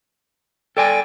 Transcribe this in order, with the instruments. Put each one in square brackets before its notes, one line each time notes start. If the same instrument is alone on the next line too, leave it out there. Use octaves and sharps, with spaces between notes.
[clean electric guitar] A4 D5 G#5 [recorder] G5